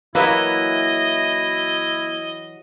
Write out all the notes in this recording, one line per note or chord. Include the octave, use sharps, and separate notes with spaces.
E3 F#3 A#3 E4 B4 D#5 E5